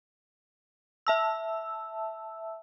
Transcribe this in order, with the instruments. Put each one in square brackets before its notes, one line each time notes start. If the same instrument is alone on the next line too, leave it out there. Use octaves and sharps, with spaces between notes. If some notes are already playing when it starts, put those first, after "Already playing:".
[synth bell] E5 A5 E6